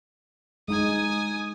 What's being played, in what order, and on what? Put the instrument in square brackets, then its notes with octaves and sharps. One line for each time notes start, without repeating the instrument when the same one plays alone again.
[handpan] G#3 D#4 [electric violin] G#5 D#6